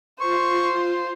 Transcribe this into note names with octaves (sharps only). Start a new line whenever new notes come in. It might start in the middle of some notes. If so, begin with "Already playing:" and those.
F4 C5 C6 C#6